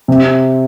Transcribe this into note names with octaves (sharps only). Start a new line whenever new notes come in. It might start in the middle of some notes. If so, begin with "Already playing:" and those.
C3